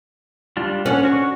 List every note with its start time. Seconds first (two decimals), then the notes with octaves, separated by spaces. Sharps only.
0.57 G3 D4 F4
0.86 C#4 F#5
1.03 D4 F#4 C#6